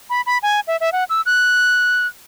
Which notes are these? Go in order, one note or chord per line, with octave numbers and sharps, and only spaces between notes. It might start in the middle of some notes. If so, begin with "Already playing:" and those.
B5
B5
G#5
E5
E5
F#5
E6
F#6